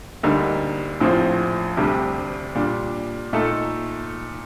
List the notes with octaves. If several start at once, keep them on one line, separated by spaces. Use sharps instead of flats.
D2 D3 G3 A#3 D#4
A#1 A2 F3 C4
D2 C3 G3 D4 G4
A#2 G3 D4
A#2 A3 D#4 A4